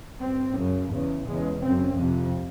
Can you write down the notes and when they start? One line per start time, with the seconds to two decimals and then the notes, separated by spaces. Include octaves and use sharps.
0.19 G2 C4
0.54 F#2 C#3
0.90 E2 C#3
1.26 E2 C#3 G#3
1.62 F#2 C#3 C4
1.98 F2 C3